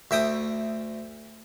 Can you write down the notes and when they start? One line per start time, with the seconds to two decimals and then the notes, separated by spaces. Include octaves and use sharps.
0.11 D2 E5 G5 D#6